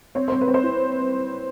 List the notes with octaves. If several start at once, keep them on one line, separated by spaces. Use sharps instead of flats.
C4 C#5
C4 C5
B4
C4
C5
E4